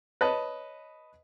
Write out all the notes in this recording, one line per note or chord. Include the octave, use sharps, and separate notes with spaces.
B4 C#5 D#5 A5